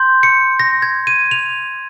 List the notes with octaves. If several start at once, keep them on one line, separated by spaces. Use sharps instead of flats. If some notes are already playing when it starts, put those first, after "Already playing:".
Already playing: C6 G6
C#7
A#6
G#6
D#7
F7